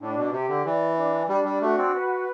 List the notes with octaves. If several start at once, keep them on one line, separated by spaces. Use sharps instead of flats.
A2 D4
B2
C3 G4
D3
E3 D5
D4
G3 D4
G3
A3 F#4
C4
B4